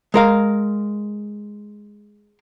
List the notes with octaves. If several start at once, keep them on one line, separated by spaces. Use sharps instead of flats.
G#3 A#4 F5